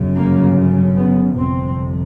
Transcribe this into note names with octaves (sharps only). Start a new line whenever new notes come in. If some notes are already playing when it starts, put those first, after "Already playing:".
Already playing: G1 F#2 C#3
A#3
B3
G1 F2 C3 C4